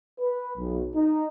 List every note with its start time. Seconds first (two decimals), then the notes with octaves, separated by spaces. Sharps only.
0.19 B4
0.57 B1
0.95 D#4